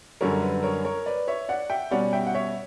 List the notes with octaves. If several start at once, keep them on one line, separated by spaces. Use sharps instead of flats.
F#2 D3 G3 A#4 C#5
B4
A#4 C#5
A#4 C#5
B4 D5
C#5 E5
D5 F#5
E5 G5
B2 G3 C#4 D5 F#5
E5 G5
F#5
C#5 E5